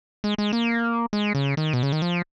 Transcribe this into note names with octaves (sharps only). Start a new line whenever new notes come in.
G#3
G#3
A#3
G#3
C#3
D#3
B2
C#3
D#3
F3